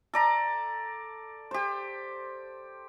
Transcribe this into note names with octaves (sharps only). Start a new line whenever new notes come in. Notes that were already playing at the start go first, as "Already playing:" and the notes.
A4 D5 A#5
G4 C5